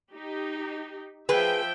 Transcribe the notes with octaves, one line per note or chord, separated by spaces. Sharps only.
D#4 G4
F3 G#4 B4 E5 G5